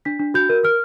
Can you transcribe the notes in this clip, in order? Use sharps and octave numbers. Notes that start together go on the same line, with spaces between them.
D4 B6
D4
F#4 G6
A#4
A#4 F6